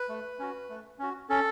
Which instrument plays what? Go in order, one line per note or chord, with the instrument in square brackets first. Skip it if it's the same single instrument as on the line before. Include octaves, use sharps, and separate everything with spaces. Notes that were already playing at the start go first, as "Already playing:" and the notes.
Already playing: [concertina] B4
A3
C#4 F#4
A3
C#4 F#4
C#4 A4